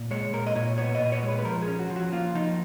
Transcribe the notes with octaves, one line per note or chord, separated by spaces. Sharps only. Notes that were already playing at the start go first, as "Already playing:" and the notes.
Already playing: A#2
G#3 C#5
A#2 A#4
D#5
A#2 C#5
B3 C#5
D#5
A#2
C#5
G#3
B4
B4
F3 A#4
G#4
C#4
F#4
F3
F#4
A#3 F4
F3 D#4